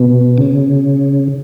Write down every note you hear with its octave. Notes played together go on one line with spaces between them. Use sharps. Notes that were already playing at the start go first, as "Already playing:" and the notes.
Already playing: B2
C#3